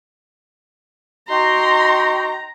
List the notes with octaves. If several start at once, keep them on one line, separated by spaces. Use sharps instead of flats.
D#4 F#4 G5 A#5 C6